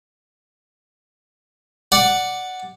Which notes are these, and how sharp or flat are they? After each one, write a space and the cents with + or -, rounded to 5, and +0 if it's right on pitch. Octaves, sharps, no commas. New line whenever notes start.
D5 +0 F#5 +0